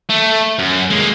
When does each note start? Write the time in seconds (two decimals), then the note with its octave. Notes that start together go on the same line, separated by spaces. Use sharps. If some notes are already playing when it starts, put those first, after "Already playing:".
0.09 A3
0.59 F#2
0.90 G#3 A#3